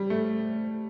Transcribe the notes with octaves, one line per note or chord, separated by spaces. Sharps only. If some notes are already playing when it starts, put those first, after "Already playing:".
Already playing: G3
A3